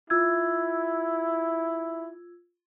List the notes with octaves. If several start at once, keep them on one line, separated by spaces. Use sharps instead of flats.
E4 F4 E6 G#6